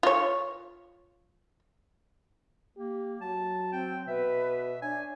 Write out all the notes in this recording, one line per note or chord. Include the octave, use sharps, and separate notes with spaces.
F4 C#5
A#3 G4
F#3 A5
C4 G5
B2 B4 E5
D4 C#5 G#5